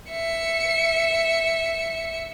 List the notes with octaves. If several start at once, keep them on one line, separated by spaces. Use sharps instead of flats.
E5 C#7